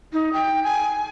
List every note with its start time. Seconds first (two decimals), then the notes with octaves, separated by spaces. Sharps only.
0.13 D#4
0.33 G5
0.64 G#5